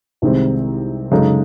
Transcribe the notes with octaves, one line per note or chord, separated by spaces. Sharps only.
C2 C3 D#3 G#3 C4
F#2 C#3 G#3 D#4 A4